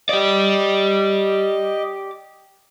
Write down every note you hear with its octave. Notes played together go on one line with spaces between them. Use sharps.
G4 D5 D#5